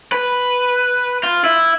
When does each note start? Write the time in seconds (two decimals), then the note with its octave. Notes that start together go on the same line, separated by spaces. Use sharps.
0.12 B4
1.23 F4
1.44 E4